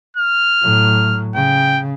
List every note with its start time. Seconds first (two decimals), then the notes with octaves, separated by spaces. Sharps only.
0.17 F6
0.63 A2 F#3
1.35 C#3 G5